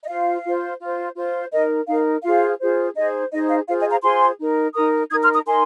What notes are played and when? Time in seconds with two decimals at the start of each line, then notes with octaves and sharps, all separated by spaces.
0.02 D#5
0.08 F4 C5 F5
0.44 F4 C5
0.80 F4 C5
1.16 F4 C5
1.52 D#4 A#4 D#5
1.87 D#4 A#4 F5
2.23 F4 G#4 C5 F5
2.59 F4 G#4 C5
2.95 D#4 G#4 C5 D#5
3.31 D#4 G#4 C5 D#5
3.49 F5
3.67 F4 G#4 C5 F5
3.80 D#5 G#5
3.91 F5 A#5
4.03 F4 G#4 C5 G#5 C6
4.39 D#4 A#4
4.75 D#4 A#4 A#5 D#6
5.10 D#4 D#6 G#6
5.13 A#4
5.23 C6 F6
5.34 A#5 D#6
5.46 D#4 A#4 G#5 C6